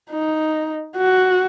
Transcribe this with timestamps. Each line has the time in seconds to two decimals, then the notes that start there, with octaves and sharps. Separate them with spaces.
0.11 D#4
0.97 F#4